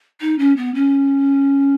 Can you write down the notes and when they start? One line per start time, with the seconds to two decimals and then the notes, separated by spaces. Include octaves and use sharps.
0.21 D#4
0.39 C#4
0.57 B3
0.75 C#4